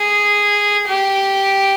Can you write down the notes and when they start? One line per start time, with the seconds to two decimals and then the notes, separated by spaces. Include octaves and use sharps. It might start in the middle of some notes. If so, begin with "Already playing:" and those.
Already playing: G#4
0.88 G4